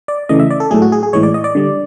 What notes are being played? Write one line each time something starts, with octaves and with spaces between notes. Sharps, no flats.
D5
C#3 E3 A3 D#5
E5
D5
A4
A2 F#3 A3 G#4
F#4
G#4
G#4
A2 E3 G#3 C#5
D5
D#5
D5
D3 G3